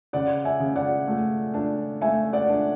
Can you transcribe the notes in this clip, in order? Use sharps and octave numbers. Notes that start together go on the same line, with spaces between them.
C#3 D5 F#5
E5 G#5
C#3
D5 F#5
A3
D4
A3 E5 G#5
D5 F#5
D4